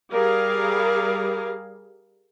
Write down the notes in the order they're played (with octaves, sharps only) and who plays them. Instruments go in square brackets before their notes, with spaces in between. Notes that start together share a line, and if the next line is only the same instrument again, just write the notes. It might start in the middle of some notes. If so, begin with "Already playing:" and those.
[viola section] G3 G#4 A#4 F5